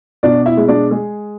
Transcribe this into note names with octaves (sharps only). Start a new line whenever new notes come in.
B2 D4 D5
E4 E5
G#3
D4 D5
G#3 G#4